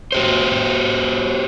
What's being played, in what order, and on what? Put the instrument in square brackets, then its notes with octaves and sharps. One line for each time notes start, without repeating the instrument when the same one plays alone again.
[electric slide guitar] F#4 G4 C5